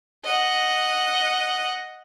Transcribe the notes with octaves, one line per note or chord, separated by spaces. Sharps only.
D#5 F#5